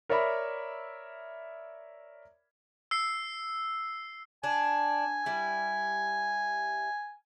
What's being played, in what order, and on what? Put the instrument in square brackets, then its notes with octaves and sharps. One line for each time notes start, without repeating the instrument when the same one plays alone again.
[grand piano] A#4 C#5 D5 E5 B5
[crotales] E6 C7
[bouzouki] D4 [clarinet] G#5
[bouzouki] G3 E4